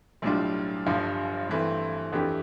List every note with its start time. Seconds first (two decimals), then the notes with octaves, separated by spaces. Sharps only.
0.22 B1 A2 G3 D4 F4
0.86 G1 G2 F3
1.49 G2 E3 A3 C4
2.12 F2 E3 A3 D4 G4